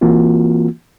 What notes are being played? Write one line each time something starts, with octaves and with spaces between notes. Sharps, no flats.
E3 A#3 C4 F4 F#4